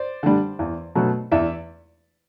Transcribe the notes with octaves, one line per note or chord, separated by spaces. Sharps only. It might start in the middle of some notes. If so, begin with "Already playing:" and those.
Already playing: C5 D5
D3 G3
E2
B2 F#3 A3
E2 D5 E5